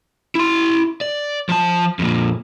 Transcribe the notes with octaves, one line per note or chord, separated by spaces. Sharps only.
E4 C6
D5
F3 A5
F2 A#2